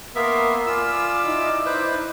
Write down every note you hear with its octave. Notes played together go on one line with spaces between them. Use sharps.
A#3 B3 A#4 E5 F5 C6
F4 D5 G#5 B5 D6 E6 F6
D#4 E4 D#5
B4 C5